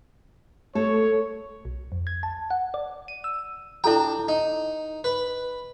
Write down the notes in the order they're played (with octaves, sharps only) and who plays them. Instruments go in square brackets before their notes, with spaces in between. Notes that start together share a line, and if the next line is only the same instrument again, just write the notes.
[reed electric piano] A3 [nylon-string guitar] A4 [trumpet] C#5
[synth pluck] B1
F2
G#6
A5
F#5
D5
D#7
E6
[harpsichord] D4 G5 [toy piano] E4 A4 A#5
[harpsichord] D#4
B4